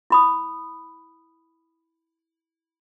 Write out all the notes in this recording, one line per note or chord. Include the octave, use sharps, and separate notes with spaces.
E4 B5 D#6